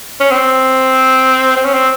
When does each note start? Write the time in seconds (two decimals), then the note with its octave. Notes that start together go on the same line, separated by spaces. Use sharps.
0.20 C#4
0.31 C4
1.57 C4
1.65 C#4
1.74 C4